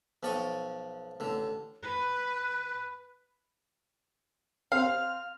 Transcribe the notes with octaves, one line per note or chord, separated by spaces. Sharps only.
B1 F3 D5 G5 C#6 D#6
A1 D3
B4 F#6
C4 F5 F6